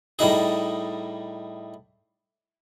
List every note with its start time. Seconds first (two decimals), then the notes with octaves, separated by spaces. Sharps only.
0.19 A2 G3 D#4 G#4